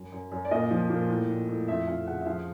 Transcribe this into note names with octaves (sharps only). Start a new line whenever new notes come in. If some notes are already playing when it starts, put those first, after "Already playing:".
Already playing: F#2
F#2
F#2
D5
A#2 D#5
F3
A#2
A2
A2
A2
F2 E5
F2 F5
C#3 F#5
E5
F3 F5